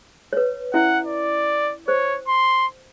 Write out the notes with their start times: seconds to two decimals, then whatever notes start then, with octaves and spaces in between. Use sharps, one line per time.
0.33 B4 C#5
0.74 C#4 E4 E5 F#5
1.04 D5
1.88 C5 C#5
2.28 C6